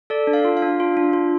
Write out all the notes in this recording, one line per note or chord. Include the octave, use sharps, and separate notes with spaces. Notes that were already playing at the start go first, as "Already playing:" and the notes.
A4 D5
D4
F5
F4
F5
D4
F4
D4
F4